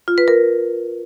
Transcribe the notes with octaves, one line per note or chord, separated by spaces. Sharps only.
F4
B4
A#4